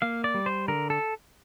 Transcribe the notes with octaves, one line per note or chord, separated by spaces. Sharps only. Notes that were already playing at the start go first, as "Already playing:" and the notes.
A#3 F5
D5
G3
C5
D3 A#4
A4